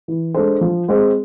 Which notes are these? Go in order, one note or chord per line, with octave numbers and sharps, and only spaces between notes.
E3
G#3 D4 A4 C5
F3
G#3 C4 G#4 C5